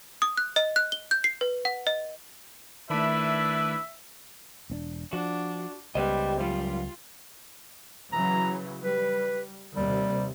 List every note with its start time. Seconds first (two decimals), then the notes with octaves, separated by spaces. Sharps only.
0.22 D#6
0.37 F#6
0.56 D#5
0.76 F#6
0.92 G7
1.11 G6
1.24 C7
1.41 B4
1.65 F#5
1.87 D#5
2.90 D#3 A3 D4 E4 B4 E5
4.70 E1 C4 D4
5.13 F3 D4 F#4
5.95 C#2 G3 B3 B4 C5 D#5
6.40 F#2 G3 F4
8.12 C#3 E3 F#3 A#5
8.83 G3 B4
9.76 D#2 C3 G3